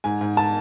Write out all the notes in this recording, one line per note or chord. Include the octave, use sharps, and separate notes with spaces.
G#2 G#5
G#2
A5